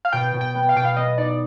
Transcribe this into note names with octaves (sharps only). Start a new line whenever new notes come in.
F5
B2 G5
B2
G5
B3
F5
B2 G5
F5
B3 D#5
D#4 D5